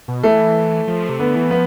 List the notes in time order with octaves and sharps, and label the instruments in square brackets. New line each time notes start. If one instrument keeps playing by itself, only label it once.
[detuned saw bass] B2
[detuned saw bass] E3 [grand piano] A3
[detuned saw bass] F3
C3
[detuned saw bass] D3 [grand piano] B3
[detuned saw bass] E3
[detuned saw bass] F3 [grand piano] B3